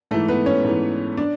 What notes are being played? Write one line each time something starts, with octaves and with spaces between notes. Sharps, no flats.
G#2 E3 A3 A4
B3 B4
C#4 C#5
G#2 E3
D4 D5